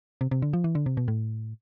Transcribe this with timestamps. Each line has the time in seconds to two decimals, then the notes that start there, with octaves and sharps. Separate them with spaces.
0.21 C3
0.31 C3
0.42 D3
0.53 F3
0.64 E3
0.75 D3
0.86 C3
0.97 B2
1.08 A2